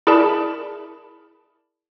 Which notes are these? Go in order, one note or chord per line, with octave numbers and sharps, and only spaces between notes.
E4 G#4 A#4 D5 A5 B5